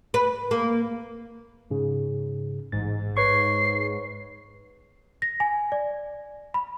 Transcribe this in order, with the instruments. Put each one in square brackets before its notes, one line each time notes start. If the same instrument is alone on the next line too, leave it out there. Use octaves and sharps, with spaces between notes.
[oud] B4
A#3
[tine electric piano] G#2 C#3
[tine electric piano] A1 A6 [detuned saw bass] G#2
[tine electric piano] B4 C#5 C#6 [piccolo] C7
[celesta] A#6
G#5
D5
B5